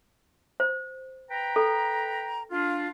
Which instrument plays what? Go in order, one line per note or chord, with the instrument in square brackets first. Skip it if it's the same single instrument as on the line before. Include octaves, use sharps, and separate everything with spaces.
[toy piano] C5
[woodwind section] B4 G5 A#5
[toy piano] A4
[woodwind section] D4 F4